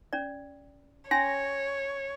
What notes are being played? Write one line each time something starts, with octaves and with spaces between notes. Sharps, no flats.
C#4 D5
C#4 C#5 G#5 C6 A#6